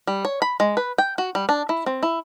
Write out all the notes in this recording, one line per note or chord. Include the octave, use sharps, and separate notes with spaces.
G3
C#5
B5
G#3
B4
G5
F#4
G3
D4
E4
C4
E4